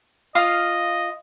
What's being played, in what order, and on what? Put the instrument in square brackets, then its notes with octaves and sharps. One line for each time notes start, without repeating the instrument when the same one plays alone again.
[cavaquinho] F4 F5 D#6 [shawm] D#5